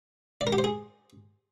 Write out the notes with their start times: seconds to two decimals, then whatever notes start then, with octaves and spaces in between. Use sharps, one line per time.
0.41 D5
0.47 A#4
0.53 G4
0.58 C5
0.64 G#4